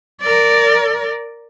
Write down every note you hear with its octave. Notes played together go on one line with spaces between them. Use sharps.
A#4 D5